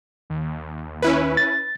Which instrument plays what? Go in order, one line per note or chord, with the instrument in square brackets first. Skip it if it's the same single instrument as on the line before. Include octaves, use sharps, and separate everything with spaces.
[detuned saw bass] D#2
[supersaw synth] C#4 E4 B4
[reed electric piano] A6